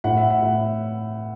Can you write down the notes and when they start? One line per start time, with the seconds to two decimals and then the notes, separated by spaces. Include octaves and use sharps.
0.04 A2 F#5
0.17 E5
0.30 F#5
0.42 A2